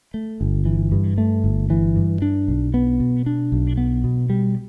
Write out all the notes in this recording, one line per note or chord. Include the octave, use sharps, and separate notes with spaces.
A3
G1
E3
G2
A3
G1
E3
G2
D4
B1
B3
B2
D4
B1
B3
B2
G3